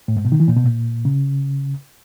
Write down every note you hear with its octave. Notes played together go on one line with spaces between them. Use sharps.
A2
G#2
B2
D#3
E3
A#2
B2
A#2
C#3